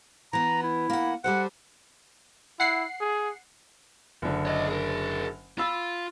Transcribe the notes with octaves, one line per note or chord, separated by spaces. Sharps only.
E3 B3 A#5
E4
A#3 F#5
G3 A4 C5 F#5
E4 F#5 C7
G#4
F#1 D3
C#5 D#5
G#4 A#4
F4 F5 B5 E6